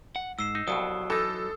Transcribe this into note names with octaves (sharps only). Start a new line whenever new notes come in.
F#5
G#2 E6 C7 E7
D#4
C2 F2 B2 F#3 D#6
E3 D#4 A4 E6